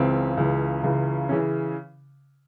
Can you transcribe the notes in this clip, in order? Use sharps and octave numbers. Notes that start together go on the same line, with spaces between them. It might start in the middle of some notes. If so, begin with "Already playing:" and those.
Already playing: C#2 C#3 E3 C4
C#2 C#3 E3
C#2 C#3 E3
C#3 E3 C#4